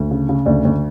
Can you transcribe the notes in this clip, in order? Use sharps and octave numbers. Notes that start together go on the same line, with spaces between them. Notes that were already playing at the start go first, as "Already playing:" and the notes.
Already playing: D2
C#3
C#3
D2 D5
D2